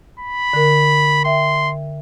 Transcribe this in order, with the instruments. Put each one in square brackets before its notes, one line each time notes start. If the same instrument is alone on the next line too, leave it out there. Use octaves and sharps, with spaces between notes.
[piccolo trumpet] B5
[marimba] D3 A#4
[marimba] E5 G5 [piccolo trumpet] C6